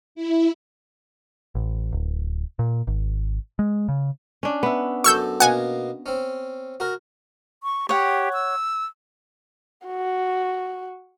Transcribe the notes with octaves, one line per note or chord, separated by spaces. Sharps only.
E4
A1
D1
A#2
G#1
G#3
C#3
C#4 D4
B3 E5
F#2 A4 C#6 D6 E6 G6
B2 A#3 F#5 G#5
C4 C#4
F#4 A#4
C#6
G4 C#5 F#5
E6
F#4